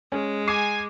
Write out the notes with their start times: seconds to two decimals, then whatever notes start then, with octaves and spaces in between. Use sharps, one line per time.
0.12 G#3 C#4
0.48 G#5 D6 C7 D#7